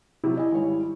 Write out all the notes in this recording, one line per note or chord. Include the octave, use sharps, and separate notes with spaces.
C3 F#3 E4
D#5 G#5
G#1 G3 C#5